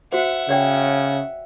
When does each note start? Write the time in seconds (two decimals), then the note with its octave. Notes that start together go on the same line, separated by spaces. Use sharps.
0.13 F#4 C5 E5 F#5
0.49 C#3 C#5 D5 G5